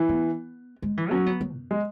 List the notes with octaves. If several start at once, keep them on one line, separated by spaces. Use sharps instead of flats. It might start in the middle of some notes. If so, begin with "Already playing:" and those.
Already playing: E3
B3
G#3
E3
F#3 C#4
B3
F#3
F#2
G#3